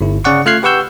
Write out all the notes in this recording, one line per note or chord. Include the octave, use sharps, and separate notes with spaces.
G1 E4
C#3 D5 F#5 C#6
A3 F4 F6 F#6 G#6 C7
G4 B4 F#5 C#6 E6 G6